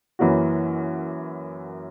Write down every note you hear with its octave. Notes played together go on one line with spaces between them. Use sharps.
F#2 E3 A#3 C#4 F#4